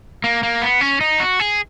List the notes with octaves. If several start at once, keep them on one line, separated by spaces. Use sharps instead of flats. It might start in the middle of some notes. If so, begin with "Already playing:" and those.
A#3
A#3
B3
C#4
D#4
F#4
G#4